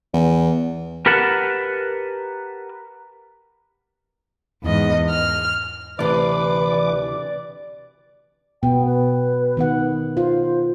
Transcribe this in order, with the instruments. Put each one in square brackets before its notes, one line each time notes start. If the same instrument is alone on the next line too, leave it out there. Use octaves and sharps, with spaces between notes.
[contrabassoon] E2
[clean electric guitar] G4 A#4 B4 F#5 A5
[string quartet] E2 G#2 D#5
F6
[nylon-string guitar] D2 C3 [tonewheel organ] E3 D6 [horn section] B4 [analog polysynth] D5
[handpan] B2 B3 [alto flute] G5
[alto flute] B4
[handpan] D#3 B3 F#5
[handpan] F4 [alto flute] C5